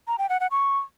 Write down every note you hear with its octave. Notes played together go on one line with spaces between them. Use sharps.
A#5
G5
F#5
F#5
C#6